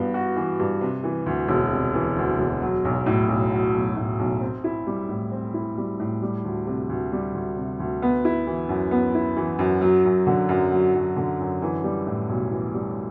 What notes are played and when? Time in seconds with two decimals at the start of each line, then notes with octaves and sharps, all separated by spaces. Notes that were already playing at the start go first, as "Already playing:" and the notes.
Already playing: G2 E3 B3 F#4
0.14 F#4
0.36 E3
0.60 G2
0.81 C3
1.03 E3
1.26 D2
1.48 E1
1.72 C3
1.94 E3
2.16 D2
2.39 E1
2.62 F#3
2.85 B1
3.06 A2
3.29 B1
3.51 F#3
3.74 B1
3.96 A2
4.19 B1
4.41 C4
4.64 E4
4.87 G3
5.09 A2
5.31 C4
5.54 E4
5.77 G3
5.99 A2
6.22 G3
6.45 D2
6.67 C3
6.89 D2
7.12 G3
7.35 D2
7.56 C3
7.80 D2
8.02 B3
8.25 E4
8.47 E3
8.69 F#2
8.91 B3
9.15 E4
9.37 E3
9.59 F#2
9.81 F#3
10.05 F#2
10.27 D3
10.49 F#2
10.72 F#3
10.94 F#2
11.16 D3
11.39 F#2
11.62 E3
11.84 G3
12.07 A2
12.29 B1
12.52 E3
12.74 G3